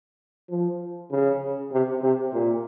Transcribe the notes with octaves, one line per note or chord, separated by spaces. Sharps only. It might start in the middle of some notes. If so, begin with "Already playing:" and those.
F3
C#3
C3
C3
A#2